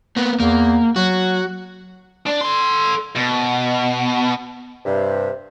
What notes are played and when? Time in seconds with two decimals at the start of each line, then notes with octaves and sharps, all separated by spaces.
0.16 A#3 B3
0.40 E2 A#3
0.96 F#3 F#4
2.27 D4
2.41 A4 C6
3.16 B2
4.85 G2 C3